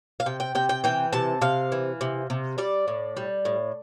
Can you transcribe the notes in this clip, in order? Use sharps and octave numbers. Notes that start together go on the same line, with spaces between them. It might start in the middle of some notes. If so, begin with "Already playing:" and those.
F5
C3 G5
G5
C3 G5
G5
E3 G5
C3 A5
C3 F5
E3
C3
C3
G3 D5
A2
G3
A2